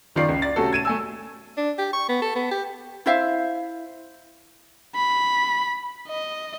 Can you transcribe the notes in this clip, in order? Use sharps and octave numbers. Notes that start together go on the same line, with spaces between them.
F#1 D#3 F4 D5 C7
C#2
D5 A6
C3 A3 C#4 F#4 A4
G#6 D#7 E7
A3 G#5 E6
D4
G4
C#6
B3
A4
B3
G4
E4 C5 E5 F5
B5
D#5